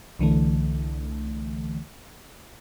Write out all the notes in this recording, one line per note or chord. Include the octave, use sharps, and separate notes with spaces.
C2 D3 E3 A3